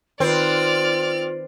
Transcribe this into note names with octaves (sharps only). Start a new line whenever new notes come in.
D#3 C4 F4 B4 D5 F6